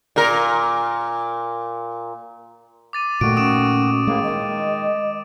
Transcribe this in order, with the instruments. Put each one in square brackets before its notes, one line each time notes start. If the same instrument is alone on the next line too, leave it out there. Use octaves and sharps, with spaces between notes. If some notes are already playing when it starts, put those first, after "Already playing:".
[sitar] A#2 A#4
[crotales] D6 A6 D#7
[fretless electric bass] A#2 A3 [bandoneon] D#3 F#4 [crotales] D7
[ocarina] C#4 [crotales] D#6 D7 E7
[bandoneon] A2 A#3 [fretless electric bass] G#3
[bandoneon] D#3 [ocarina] D#5